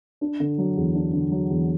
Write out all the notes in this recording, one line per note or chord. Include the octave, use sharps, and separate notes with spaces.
D4
D3
F#3
E2
D4
D3
F#3
E2